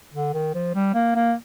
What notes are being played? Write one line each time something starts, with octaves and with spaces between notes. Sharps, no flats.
D3
D#3
F3
G3
A#3
A#3